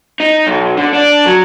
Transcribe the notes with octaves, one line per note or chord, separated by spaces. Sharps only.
D#4
B1
D3
D4
F#3